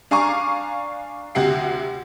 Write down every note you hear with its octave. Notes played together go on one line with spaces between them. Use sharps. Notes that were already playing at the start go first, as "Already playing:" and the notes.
D4 F5 G#5 A#5 C#6 D6
D2 C3 F#5 G5 C7